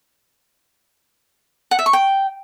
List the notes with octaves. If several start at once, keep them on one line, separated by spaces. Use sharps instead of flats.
F#5
E5
C#6
G5